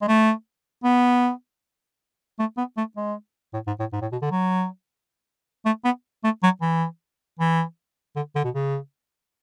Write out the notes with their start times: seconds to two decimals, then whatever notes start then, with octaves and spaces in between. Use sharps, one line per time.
0.02 G#3
0.08 A3
0.84 B3
2.39 A3
2.57 B3
2.77 A3
2.96 G#3
3.54 A2
3.67 G#2
3.79 A2
3.93 G#2
4.02 A2
4.12 B2
4.22 D3
4.31 F#3
5.65 A3
5.85 B3
6.24 A3
6.43 F#3
6.62 E3
7.39 E3
8.16 D3
8.35 D3
8.44 B2
8.55 C#3